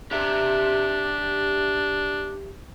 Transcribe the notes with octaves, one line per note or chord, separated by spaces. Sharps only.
D4 G4 E5